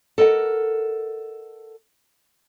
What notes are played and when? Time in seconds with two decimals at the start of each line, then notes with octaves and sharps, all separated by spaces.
0.18 A4 A#4 D#5 F#5